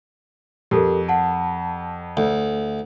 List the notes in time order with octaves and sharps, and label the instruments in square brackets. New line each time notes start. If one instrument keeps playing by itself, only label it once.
[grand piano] F2 [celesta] G4 A4 A#4
[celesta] F#5 A5
[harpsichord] D2